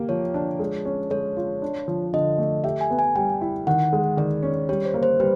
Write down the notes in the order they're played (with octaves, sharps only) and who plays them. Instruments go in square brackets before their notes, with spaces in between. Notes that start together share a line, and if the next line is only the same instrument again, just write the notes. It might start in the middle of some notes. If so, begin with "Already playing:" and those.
Already playing: [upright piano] A#3 G4
[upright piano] F3 [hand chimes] C#5
[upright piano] D4
G#3
C#4
[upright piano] G#3 [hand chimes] C#5
[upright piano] F4
D4
F3
[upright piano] D3 [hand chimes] D#5
[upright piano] A3
[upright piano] G4 [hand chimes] E5
[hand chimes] G#5
[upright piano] B3
[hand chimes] G#5
[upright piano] G3 [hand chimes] G5
[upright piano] E4
[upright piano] D#3 [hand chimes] F#5
[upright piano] G#3
[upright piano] D#3 [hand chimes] D5
[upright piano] C#4
[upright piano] G3 [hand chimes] C#5
[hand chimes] C5
[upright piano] A#3
[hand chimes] C5
[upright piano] G3 [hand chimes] B4